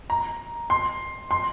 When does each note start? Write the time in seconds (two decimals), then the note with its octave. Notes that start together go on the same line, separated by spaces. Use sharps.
0.10 A#5
0.70 C6
1.31 C6